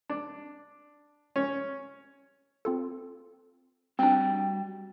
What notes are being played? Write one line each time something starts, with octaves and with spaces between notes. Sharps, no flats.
D4
C#4
C4 F4 A4
G3 C4 D4 F#4 G5